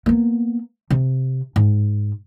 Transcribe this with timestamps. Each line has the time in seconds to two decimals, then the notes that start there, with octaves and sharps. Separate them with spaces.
0.06 A#3 B3
0.90 C3
1.56 G#2